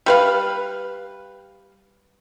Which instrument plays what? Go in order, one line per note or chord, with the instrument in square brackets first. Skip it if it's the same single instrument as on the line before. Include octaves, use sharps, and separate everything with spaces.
[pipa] G3 B4 F5